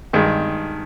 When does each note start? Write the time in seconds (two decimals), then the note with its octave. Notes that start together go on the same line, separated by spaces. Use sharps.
0.13 G2 D#3 G#3